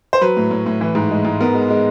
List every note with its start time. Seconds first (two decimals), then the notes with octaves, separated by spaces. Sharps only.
0.13 C5
0.21 F#3 B4
0.37 A2
0.51 A2
0.66 A2
0.81 E3
0.95 G#2
1.11 G#3
1.25 G#2
1.41 B3 A#4
1.55 G#3
1.70 G#3